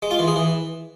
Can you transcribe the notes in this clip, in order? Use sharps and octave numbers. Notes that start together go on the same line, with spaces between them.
G#3
F4
E3
G#4
E3